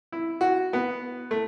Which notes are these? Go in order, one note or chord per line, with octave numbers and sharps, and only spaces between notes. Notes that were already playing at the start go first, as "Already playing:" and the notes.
E4
F#4
B3
A3